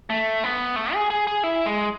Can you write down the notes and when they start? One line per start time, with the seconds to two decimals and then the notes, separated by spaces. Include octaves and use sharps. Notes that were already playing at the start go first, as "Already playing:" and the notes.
0.10 A3
0.44 B3
0.76 A3
0.94 G#4
1.10 G#4
1.27 G#4
1.44 E4
1.66 G#3